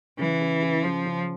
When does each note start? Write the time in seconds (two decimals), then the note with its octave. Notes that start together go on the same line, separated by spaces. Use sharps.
0.18 C#3 E3
0.41 C#3
0.62 C#3
0.84 C#3 F3
1.06 C#3